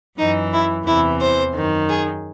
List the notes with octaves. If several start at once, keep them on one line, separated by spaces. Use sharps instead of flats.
F#2 E3 D#4
E4
E2 C3 E3 E4
C5
F#2 D#3
G#4